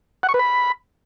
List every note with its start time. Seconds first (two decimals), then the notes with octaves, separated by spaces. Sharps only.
0.23 F#5
0.29 C#6
0.34 B4
0.39 B5